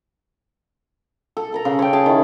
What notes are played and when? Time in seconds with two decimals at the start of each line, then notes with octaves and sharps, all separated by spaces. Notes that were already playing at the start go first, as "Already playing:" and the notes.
1.37 A4
1.52 A4 A#4 A#5
1.65 C#3
1.79 C#5 G5
1.93 G#4 A5
2.06 D#3 E4